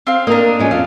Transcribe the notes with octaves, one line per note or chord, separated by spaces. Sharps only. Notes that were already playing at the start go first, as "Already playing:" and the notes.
C4 F5
A#3 D4 A#4 D#5
F3 G#3 C#4
F2 F5